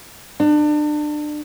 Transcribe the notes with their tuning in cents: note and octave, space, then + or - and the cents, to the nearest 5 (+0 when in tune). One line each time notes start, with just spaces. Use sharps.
D4 +30